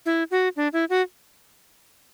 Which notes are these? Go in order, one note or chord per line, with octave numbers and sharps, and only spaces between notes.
E4
F#4
D4
E4
F#4